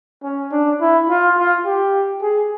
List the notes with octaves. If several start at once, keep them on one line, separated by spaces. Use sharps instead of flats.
C#4
D4
E4
F4
F4
G4
G#4